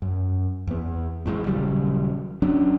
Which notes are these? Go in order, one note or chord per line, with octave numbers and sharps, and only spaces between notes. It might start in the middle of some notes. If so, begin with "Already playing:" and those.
F#2
E2 B3
A1 A2 C#3 G#3
D#1 C#3 F#3 G3
F#3 C#4 D4